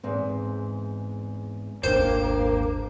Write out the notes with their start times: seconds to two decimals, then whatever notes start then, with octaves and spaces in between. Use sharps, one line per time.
0.03 E2 G#2 C4
1.84 D#1 G#1 F2 A#3 D4 C5